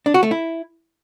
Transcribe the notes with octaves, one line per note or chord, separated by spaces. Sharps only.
D4
F#4
A3
E4